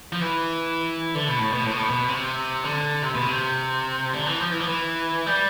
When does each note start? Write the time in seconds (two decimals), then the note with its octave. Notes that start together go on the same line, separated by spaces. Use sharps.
0.12 F3
0.21 E3
1.15 D3
1.27 B2
1.39 A2
1.52 B2
1.64 A2
1.71 B2
1.77 A2
1.89 B2
2.08 C3
2.64 D3
3.02 C3
3.15 B2
3.27 C3
4.14 D3
4.27 E3
4.40 F3
4.51 E3
4.60 F3
4.67 E3
5.26 G3